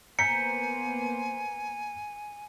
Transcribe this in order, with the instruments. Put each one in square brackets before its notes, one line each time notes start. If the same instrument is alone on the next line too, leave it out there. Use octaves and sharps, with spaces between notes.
[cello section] A#3 B3 C5 [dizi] G#5 [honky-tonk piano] A#5 G6 B6 [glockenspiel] C#7